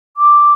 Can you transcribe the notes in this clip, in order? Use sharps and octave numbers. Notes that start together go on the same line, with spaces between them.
D6